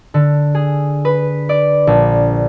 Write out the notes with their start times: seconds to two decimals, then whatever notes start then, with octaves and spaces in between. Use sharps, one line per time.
0.14 D3
0.55 G#4
1.05 B4
1.49 D5
1.87 A#1